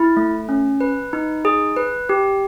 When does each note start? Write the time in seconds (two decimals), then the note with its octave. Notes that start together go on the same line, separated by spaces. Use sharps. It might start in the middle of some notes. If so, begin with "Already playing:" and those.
Already playing: E4
0.17 A3
0.49 C#4
0.81 B4
1.13 D#4
1.45 G#4
1.76 B4
2.09 G4